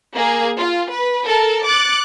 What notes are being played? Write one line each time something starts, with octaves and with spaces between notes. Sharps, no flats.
A#3 G#4
F4
B4
A4 A#4 A5
D6 F#6 A6 C#7